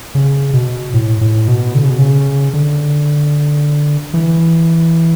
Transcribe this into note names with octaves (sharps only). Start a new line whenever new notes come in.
C#3
B2
A2
A2
B2
D3
C#3
B2
C#3
D3
E3